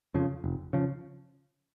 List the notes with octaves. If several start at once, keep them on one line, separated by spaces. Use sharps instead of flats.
F2 C#3 F3
F1
C#3 F3